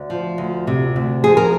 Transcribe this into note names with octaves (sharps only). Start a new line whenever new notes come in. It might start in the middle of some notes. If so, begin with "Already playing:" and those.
Already playing: D2
F3
D2
C3
D2
F3 G#4
A#4